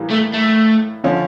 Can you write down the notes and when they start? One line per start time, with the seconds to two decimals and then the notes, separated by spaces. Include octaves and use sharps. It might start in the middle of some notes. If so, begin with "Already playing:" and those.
Already playing: A2 E3 G3 A#3
0.11 A3
0.34 A3
1.04 D3 F3 C#4